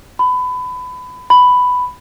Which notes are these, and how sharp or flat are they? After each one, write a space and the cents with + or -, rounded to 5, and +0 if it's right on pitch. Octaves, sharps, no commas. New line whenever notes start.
B5 +25
B5 +10